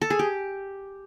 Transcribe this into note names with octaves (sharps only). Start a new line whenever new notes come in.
A4
G#4
G4